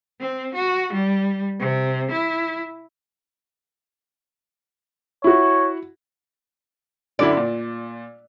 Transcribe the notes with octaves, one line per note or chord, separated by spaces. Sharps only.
C4
F#4
G3
C3
E4
E4 F#4 C#5
F#2 D3 E4 D5
A#2